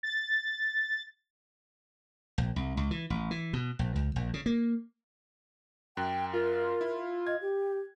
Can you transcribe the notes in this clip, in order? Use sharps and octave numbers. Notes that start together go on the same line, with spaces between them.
A6
A#1
C2
C#2
E3
A1
E3
B2
A#1
C#2
A#1
C#3
A#3
F#2 G5 F#6
F4 A#4
E4
D#5 G#6
G4